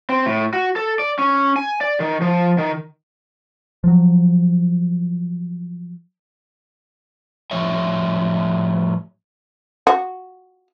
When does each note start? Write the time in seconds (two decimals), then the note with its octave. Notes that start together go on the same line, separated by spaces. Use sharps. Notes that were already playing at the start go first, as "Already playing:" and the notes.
0.09 C4
0.26 A2
0.53 F#4
0.76 A4
0.99 D5
1.19 C#4
1.56 G#5
1.81 D5
2.00 D#3
2.22 F3
2.58 D#3
3.84 F3 F#3
7.51 A2 F3 G3 C#5 E5
9.87 F#4